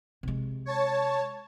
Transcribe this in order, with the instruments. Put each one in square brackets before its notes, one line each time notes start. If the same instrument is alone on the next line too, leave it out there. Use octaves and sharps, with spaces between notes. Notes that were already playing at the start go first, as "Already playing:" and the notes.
[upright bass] C3 G#3
[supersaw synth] C#5 A5